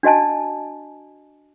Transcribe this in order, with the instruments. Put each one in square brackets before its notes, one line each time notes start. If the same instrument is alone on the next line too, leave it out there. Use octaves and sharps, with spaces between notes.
[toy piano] D4 F#4 D#5 G#5 A5